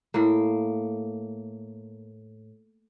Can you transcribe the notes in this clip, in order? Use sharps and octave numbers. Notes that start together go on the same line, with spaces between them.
A2 A#3